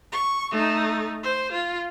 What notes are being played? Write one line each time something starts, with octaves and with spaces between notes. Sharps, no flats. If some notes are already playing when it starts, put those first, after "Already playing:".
C#6
A3 D#4
C5
F4